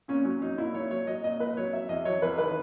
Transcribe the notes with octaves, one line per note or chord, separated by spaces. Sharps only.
A#2 C#4
F#3 C#4
F#3 D#4
A#2 E4
A#2 C#5
F#3 C#5
F#3 D#5
A#2 D#5
A#2 B4
F#3 C#5
F#3 E5
E2 D#5
F#3 C#5
E2 B4
D#3 B4